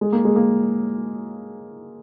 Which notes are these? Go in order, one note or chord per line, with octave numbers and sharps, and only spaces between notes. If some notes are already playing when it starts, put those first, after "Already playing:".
G#3
A#3
G#3
A#3